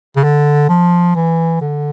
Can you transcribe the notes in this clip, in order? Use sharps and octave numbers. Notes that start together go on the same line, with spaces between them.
C#3
D3
F3
E3
D3